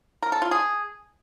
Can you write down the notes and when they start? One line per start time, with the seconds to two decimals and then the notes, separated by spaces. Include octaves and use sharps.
0.23 A#4
0.32 A4
0.42 F4
0.51 G#4